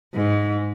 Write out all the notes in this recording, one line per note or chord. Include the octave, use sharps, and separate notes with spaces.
G#2